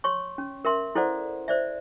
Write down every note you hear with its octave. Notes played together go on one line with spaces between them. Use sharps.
C#5 C6 C#6
C#4
A#4 E5 C6
E4 A4 C5 D5 F#5
C5 D5 E5